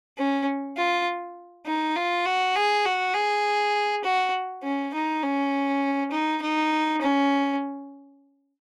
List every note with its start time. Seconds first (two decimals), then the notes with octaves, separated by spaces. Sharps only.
0.17 C#4
0.77 F4
1.66 D#4
1.96 F4
2.25 F#4
2.55 G#4
2.85 F#4
3.14 G#4
4.04 F#4
4.63 C#4
4.94 D#4
5.23 C#4
6.11 D#4
6.42 D#4
7.01 C#4